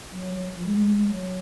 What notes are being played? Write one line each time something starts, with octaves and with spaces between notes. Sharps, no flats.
F#3
F#3
F3
G#3
G#3
G#3
G#3
F#3